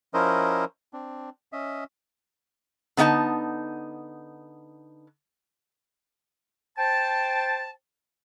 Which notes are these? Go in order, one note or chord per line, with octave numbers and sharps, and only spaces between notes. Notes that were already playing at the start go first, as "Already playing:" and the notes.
F3 C#4 E4 A#4 C5 D#5
C4 D4
C#4 D#5 E5
D3 B3 D4 D#4 A5
C5 G5 A5